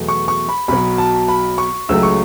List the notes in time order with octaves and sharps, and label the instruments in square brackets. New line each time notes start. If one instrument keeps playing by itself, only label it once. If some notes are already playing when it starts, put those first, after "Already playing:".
Already playing: [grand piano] E2 B2 F#3 A3
C#6
C#6
B5
B1 B2 F#3 B5
A5
B5
C#6
C#2 C#3 F#3 A3 E6
C#6